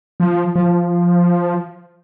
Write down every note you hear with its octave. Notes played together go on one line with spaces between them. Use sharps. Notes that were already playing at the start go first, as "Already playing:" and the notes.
F3
F3